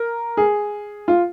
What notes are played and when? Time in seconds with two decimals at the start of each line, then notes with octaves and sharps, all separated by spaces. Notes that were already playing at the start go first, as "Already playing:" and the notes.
Already playing: A#4
0.37 G#4
1.08 F4